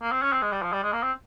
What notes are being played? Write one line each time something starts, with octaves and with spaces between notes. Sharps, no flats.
A#3
C4
C#4
C4
G#3
G3
F3
G3
G#3
A#3
C4